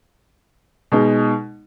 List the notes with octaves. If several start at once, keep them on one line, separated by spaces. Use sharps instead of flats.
B2 G#3 D#4